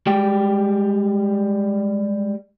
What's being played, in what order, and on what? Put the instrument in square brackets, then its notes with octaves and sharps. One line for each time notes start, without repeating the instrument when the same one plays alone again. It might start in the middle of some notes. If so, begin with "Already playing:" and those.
[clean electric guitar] G3 G#3 G5